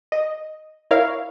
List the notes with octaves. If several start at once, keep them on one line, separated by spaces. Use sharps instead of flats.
D#5
E4 A#4 C#5 F5